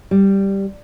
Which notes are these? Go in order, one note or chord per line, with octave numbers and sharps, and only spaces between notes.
G3